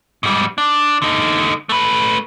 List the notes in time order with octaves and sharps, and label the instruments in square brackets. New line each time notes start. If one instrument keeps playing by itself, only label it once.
[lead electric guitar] G#2 G3
D4
D3 D#4
A3 B4